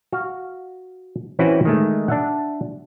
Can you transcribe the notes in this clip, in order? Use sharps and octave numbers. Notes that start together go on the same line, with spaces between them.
F#4 F5
E3 C4 C#4 E4 F#4 B4
D#3 G#3 A3
D4 E5 F#5